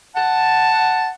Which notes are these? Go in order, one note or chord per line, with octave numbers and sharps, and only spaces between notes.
F#5 A5